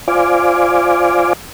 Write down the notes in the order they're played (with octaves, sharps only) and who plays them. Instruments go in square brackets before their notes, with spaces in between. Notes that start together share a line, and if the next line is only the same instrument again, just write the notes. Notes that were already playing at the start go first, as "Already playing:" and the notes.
[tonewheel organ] F4 C5 D5 F5 G#5 D6